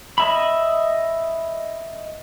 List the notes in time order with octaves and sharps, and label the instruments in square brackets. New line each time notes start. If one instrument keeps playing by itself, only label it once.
[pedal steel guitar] D#5 E5 B5